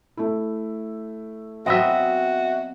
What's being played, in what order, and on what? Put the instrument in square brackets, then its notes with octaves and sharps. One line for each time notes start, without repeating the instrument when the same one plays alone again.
[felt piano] A3 E4
[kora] F#3 B3 C4 [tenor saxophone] F#4 [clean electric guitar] D#5 E5